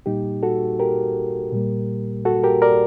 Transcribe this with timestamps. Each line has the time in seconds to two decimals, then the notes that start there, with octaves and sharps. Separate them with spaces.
0.06 A#2 G3 A#3 D#4 G4
0.43 F#4 A4
0.80 G4 A#4
1.53 A#2 G3 A#3
2.25 F#4 A4
2.44 G4 A#4
2.62 A#4 D5